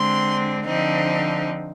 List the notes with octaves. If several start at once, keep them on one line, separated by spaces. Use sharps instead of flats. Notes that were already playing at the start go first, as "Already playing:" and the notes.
Already playing: D3 G#3 C4 C6
D3 F3 C4 D#4